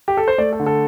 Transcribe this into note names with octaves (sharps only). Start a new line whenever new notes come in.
G4
A4
C5
A3 D5
A4
D3
A4